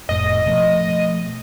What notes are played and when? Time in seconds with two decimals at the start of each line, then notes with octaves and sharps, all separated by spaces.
0.09 F1 A2 D#5
0.46 B2 F3 A3